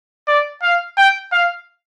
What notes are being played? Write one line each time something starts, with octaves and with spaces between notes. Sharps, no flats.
D5
F5
G5
F5